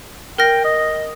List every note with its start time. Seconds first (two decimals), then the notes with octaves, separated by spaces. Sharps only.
0.38 A#4 G5 F6 A#6
0.64 D#5